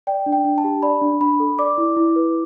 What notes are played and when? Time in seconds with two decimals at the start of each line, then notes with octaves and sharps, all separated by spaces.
0.07 D5 G5
0.26 D4
0.32 G5
0.45 D4
0.58 A5
0.64 G4
0.82 D5 B5
1.01 D4
1.21 D4 B5
1.40 A4
1.59 D5 D6
1.78 E4
1.97 E4
2.16 B4